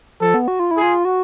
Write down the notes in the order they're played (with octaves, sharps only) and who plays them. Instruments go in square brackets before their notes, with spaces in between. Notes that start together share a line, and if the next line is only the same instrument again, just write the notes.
[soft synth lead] F3 [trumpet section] A4
[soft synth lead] B3
F#4
F4
[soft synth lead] E4 [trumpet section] G#4
[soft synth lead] F4
F#4